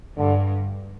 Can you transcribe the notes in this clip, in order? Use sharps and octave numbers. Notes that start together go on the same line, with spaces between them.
G2 D3